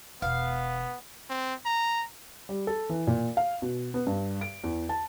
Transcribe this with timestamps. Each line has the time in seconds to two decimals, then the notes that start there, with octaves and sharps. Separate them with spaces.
0.22 E1 B3 F5
1.30 C4
1.66 A#5
2.49 G3
2.67 A4
2.90 E3
3.07 A#2
3.37 F5
3.62 B2
3.94 B3
4.07 G2
4.41 D7
4.64 E2
4.89 A5